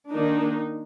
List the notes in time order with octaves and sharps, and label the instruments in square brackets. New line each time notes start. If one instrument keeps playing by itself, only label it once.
[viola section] D#3 A#3 D4 D#4